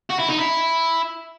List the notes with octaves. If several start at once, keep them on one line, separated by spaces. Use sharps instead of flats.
F#4
E4
D#4
E4